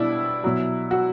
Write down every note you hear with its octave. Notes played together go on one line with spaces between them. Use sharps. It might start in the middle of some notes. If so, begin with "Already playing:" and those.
Already playing: B2 G3 D4 E4
B2 F#3
F#4